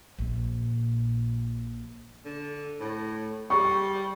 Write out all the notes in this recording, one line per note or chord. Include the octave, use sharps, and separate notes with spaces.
A#1 A#2
D3
A2
G3 C#6